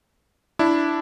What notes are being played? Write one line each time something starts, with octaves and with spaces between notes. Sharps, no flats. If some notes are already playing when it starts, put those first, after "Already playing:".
D4 E4